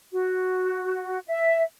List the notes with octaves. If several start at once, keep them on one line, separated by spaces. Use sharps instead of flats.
F#4
E5